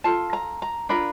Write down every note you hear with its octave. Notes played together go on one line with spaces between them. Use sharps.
F4 A4 A5
A#5
A#5
D4 F4 A#4 B5